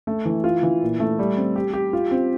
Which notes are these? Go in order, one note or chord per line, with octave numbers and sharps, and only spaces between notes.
A3
E3
F4
E3
A#2
A3
G3
C4
G4
G4
F4
C4